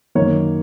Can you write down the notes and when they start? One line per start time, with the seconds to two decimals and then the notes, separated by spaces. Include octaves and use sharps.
0.15 F#2 D#3 A#3 C#5